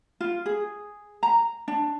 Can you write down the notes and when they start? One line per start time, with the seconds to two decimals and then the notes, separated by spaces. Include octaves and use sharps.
0.20 F4
0.46 G#4
1.23 A#5
1.68 D4